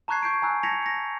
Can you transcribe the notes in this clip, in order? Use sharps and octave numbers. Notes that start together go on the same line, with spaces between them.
A5 A#5 C#6 F#6 G#6 C7
C#6 G6 C7 D7
G#5 A#5 E6 F#6
A5 G#6 A#6 B6 C#7 F7
A#6 C#7